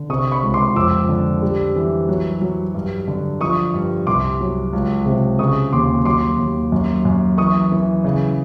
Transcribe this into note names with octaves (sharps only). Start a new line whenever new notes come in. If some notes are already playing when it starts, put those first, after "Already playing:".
Already playing: D3
C3 C#6 D#6
B5 C#6
C#2
C6 D6
F2 D6 E6
D3
G3
E3
F#3
F#3
G2
D3
F3 C#6 D#6
G2
C2 C6 D6
F#3
C#2
C3
C#3 C#6 D#6
D#2 C6 D6
F#3 C6 D6
D#2
F#2
F#2
E3 C#6 D#6
E3
C#3